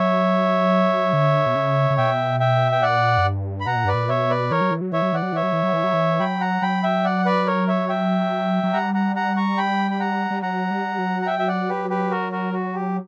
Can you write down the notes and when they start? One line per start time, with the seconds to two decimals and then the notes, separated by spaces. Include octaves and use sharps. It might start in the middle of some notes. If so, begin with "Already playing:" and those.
Already playing: F#3 C#5 E5
1.13 D3
1.46 B2
1.55 C#3
1.90 C#3
1.97 B2 E5 G5
2.40 E5 G5
2.72 G5
2.82 A#2 D5 F#5
3.18 F#2
3.24 G2
3.60 B5
3.66 B2 F#5 A#5
3.76 A#2
3.85 G2 B4 D5
3.94 A#2
4.09 B2 C#5 E5
4.30 B4 D5
4.51 E3 A#4 C#5
4.61 F#3
4.71 E3
4.81 F#3
4.92 E3 C#5 E5
5.02 F#3
5.13 E3 D5 F#5
5.22 F#3
5.32 E3 C#5 E5
5.43 F#3
5.53 E3
5.63 F#3
5.73 E3
5.84 F#3
5.93 E3
6.20 F#3 G5 B5
6.41 F#5 A#5
6.62 F#3 G5 B5
6.83 E5 G5
7.05 D5 F#5
7.25 B4 D5
7.47 A#4 C#5
7.68 C#5 E5
7.89 E5 G5
8.63 F#3
8.73 G3 F#5 A#5
8.94 F#5 A#5
9.16 F#5 A#5
9.37 A#5 C#6
9.57 G5 B5
9.91 B5
10.00 F#5 A#5
10.31 G3
10.42 F#3 F#5 A#5
10.71 G3
10.98 F#3
11.22 A#5
11.26 E5 G5
11.39 E5
11.48 D5 F#5
11.69 G4 B4
11.90 G4 B4
12.11 F#4 A#4
12.32 F#4 A#4
12.53 F#4
12.75 G4